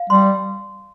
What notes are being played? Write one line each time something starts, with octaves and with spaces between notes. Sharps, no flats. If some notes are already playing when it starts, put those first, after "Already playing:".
Already playing: F5
G3 C6